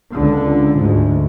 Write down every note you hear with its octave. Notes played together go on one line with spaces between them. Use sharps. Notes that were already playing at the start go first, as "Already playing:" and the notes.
C#2 D3
D2 G#2